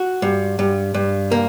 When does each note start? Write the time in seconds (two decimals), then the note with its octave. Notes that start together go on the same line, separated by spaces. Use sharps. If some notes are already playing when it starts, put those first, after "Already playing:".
Already playing: F#4
0.22 G2
0.59 G2
0.94 G2
1.31 A#3